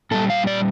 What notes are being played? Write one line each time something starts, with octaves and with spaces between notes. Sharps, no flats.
A#2 G3 A4
F5
D5